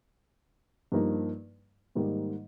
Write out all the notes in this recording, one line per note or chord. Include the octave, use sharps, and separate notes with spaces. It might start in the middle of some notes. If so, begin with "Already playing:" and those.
G2 F3 A#3 D#4
G#2 D#3 G3 A#3 D#4